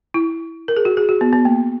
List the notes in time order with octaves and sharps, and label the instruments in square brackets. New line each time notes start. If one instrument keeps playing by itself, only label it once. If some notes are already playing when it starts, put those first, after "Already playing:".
[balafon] E4
A#4
G#4
F#4
G#4
F#4
B3
B3
A#3